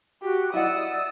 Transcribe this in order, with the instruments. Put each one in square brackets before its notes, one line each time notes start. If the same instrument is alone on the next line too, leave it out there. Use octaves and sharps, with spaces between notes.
[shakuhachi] F#4 [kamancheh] G4
[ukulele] E4 D#5 F#5 [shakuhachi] D5 [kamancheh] D#6 E6